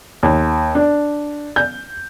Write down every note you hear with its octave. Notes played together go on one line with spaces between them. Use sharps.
D#2
D4
G6